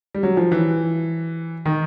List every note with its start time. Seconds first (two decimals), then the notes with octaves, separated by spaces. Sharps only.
0.15 G3
0.23 F#3
0.37 F3
0.52 E3
1.66 D#3